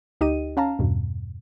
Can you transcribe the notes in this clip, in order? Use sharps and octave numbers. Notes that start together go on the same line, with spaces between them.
D2 D#4 G4 D#5 D#7
C#4 F5 A5 A#5
E2 G2 B2